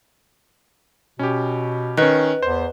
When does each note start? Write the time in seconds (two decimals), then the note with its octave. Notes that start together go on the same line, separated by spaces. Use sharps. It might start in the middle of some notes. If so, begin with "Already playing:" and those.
1.19 B2 C#4 G4
1.97 D#3 C#4 B4 D#5 F#6
2.43 E2 C5